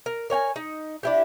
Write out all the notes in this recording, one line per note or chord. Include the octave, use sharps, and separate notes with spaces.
A#4
A#4 C#5 G5 G#5
D#4
D4 E4 G4